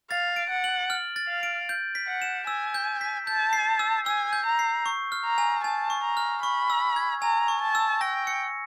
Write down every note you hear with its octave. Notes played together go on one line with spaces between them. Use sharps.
F5 A6
D7
F#5
F#7
F6
A6
F5
D7
G6
B6
F#5
E7
G#5 E6
G6
B6
A5 G6
C7
E6
G#5 E6
G6
A#5
C7
C#6
F6
A#5
G#5
G#5 A5
C#6
A#5
F6
B5 C#6
E6
G#6
G#5 A#5
C#6
A5
E6
G5 A#6
C#7